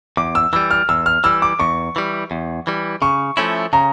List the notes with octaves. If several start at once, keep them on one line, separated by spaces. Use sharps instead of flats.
E2 D6
E6
E3 G3 E6
F6
E2 E6
F6
E3 G3 E6
D6
E2 C#6
E3 G3
E2
E3 G3
C#3 C#6
F3 A3 C#4 E4
C#3 A#5